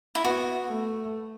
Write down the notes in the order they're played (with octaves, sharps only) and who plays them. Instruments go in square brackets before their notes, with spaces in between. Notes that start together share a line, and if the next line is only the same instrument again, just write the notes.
[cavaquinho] E4
[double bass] B3 [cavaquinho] F#4
[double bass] A3